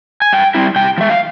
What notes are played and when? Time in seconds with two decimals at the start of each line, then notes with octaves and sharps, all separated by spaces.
0.22 G#5
0.33 G2 G5
0.55 G3 C4 E4
0.76 C3 G5
0.98 F3
1.01 G#3 E5
1.10 F5